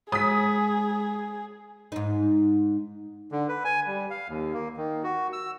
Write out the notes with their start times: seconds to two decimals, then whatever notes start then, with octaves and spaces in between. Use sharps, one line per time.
0.12 G#3 G#4 D#6 B6
1.92 G#2 D#4
3.32 D3
3.49 B4
3.64 G#5
3.87 G3
4.10 F5
4.29 D#2
4.53 A#3
4.77 D#3
5.03 F#4
5.33 E6